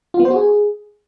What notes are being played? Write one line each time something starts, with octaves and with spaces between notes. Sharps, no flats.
F4
B3
C5
F#4
G#4